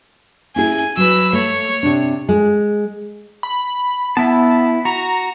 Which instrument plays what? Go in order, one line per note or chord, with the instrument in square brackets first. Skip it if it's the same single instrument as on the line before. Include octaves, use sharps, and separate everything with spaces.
[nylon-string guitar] C#4 E4 G#4 [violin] G#5
[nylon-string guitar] F#3 [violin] B4 E6
[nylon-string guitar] A3 [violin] C#5
[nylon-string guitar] C3 D4
G#3
[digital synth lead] B5
[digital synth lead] B3 [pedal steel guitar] E4 A5
[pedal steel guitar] F#4 [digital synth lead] A#5